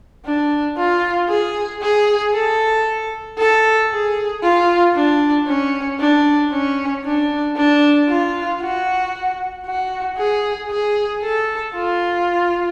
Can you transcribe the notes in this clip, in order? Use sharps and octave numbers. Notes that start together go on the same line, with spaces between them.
D4
F4
G#4
G#4
A4
A4
G#4
F4
D4
C#4
D4
C#4
D4
D4
F4
F#4
F#4
G#4
G#4
A4
F4